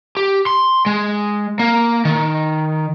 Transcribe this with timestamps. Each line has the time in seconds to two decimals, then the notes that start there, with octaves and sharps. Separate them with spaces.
0.17 G4
0.46 C6
0.86 G#3
1.59 A#3
2.05 D#3